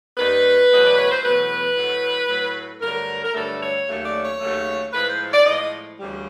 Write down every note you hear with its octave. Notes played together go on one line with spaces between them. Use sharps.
D#2 D#3 G3 B4
E2 B2 F#3 A3 D#5
D5
C#5
C5
E2 B2 F#3 A3 B4
A2 F#3 A3
A2 F#3 A3
G2 D3 F#3 A3 A#4
A#4
G2 D3 F#3 A3 A4
C#5
D#2 C#3 F#3 A3
D5
C#5
D#2 C#3 F#3 A3
A2 F3 G#3 B4
C5
D5
A2 F3 G#3 D#5
D2 C#3 E3 G3